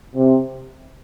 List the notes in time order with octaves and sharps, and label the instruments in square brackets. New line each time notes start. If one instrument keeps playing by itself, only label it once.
[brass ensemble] C3